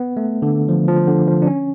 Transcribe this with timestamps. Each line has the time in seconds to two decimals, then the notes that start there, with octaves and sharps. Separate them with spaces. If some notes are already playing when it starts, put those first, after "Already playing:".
Already playing: B3
0.17 A3
0.42 D3
0.69 F3
0.88 F3
1.07 D3
1.27 F3
1.42 D4
1.47 C#4